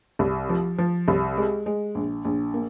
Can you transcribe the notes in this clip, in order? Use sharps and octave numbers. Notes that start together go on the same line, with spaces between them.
C2
F3
F3
C2
G#3
G#3
A#1
A#1
A#3